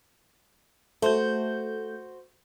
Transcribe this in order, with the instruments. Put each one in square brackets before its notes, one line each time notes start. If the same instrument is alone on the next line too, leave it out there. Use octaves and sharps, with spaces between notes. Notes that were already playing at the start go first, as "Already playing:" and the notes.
[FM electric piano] A3 G6 [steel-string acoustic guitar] F#4 C5